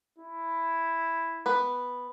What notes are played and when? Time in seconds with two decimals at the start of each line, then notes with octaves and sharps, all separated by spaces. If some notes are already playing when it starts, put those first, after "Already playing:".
0.18 E4
1.46 B3 B4